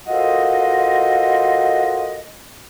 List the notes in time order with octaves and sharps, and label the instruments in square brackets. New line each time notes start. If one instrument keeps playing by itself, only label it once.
[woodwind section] F4 F#4 A4 A#4 C5 D#5